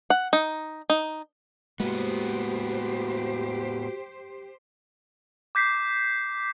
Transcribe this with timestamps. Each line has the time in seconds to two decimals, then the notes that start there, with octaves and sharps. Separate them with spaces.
0.10 F#5
0.33 D#4
0.90 D#4
1.80 A2 G#3 A#3 B3 F#4 G4 C5
5.55 D6 G6 B6 C7